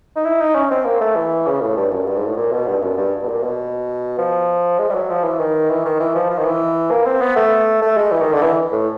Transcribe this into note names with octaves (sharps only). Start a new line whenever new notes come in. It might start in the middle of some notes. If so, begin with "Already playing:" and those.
D#4
E4
D#4
C#4
C4
A#3
A3
E3
C#3
A2
G2
F#2
G2
G#2
A2
A#2
B2
G2
F#2
G2
B2
A#2
B2
F3
G#3
G3
F#3
F3
E3
D#3
E3
D#3
E3
F3
F3
D#3
E3
A#3
C4
B3
A3
A3
G#3
E3
D#3
D3
E3
A2